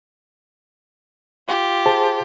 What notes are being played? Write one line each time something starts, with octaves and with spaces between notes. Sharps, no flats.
F4 G4
G#4 C5 A5